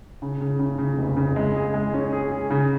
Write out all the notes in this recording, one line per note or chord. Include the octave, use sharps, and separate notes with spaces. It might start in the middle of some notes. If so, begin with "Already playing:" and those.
C#3
C#3
C#3
C#3
F1
C#3
G#3
G#4
G#3
C#4
G#4
G#4
C#3